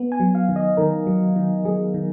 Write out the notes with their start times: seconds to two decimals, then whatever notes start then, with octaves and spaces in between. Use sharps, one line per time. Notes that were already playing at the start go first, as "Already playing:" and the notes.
Already playing: B3
0.12 G#5
0.20 F#3
0.35 F5
0.49 D#3
0.56 D#5
0.77 D#3 A#4
1.07 F#3
1.36 D#3
1.65 F#3 G#4
1.94 D#3